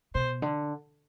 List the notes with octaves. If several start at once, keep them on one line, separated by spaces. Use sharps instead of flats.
B2 C5
D3